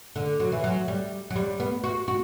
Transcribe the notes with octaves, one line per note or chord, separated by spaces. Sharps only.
D3
F#3
E3
F#3
G3
F#3
G3
B3
F#4
F#4